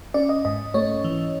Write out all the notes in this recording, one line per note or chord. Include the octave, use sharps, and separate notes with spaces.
C#4 D5
D#5
G#2 D#5
A3 C#5
E3